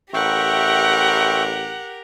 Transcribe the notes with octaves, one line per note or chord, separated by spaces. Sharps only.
A1 G4 A#4 E5 F#5 G5 C#6